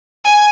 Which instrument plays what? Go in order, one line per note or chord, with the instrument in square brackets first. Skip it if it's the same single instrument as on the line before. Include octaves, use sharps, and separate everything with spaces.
[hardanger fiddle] G#5